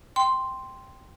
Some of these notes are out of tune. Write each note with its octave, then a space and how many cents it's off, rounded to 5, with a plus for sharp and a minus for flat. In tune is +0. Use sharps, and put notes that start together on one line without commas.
G5 +0 C6 +0